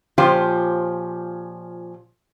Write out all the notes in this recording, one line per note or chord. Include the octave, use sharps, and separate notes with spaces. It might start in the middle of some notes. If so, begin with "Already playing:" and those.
A#2 F3 C#4 F4 G4 C5